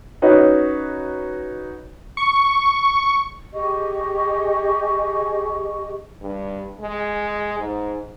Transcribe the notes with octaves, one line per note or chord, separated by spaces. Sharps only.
C#4 D#4 F#4 B4 C#5 D#5
C#6
G4 G#4 D#5 C#6
G2
G#3
G#2